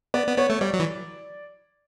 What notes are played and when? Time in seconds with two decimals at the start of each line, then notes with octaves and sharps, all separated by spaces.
0.14 B3 D5
0.27 B3
0.38 B3 C#5
0.50 A3
0.61 G3 D5
0.73 F#3
0.79 E3